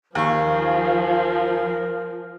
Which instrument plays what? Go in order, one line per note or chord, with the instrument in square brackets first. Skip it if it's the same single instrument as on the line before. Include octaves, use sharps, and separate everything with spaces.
[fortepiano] D#2 C#6 [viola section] F3 [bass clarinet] A#4 [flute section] F5 G#5